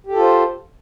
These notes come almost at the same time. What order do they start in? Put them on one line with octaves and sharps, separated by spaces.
G4 A4 F4 C5